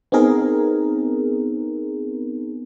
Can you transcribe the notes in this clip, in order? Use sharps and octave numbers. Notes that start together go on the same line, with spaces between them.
B3 C4 D#4 G#4 A#4